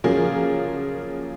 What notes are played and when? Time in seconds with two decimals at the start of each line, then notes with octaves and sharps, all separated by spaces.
0.04 C#3 F3 F#3 A#3 G#4